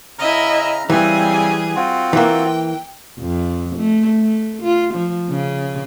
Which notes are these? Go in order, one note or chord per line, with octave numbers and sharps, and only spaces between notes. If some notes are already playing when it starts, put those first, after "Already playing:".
C#3 E4 D#5 E5 A#5 F6
C#3 E3 G3 C4 G#4 G#5
C4 F4 F#4
E3 A#3 G5
F2
A3
A3
F4
F3
C#3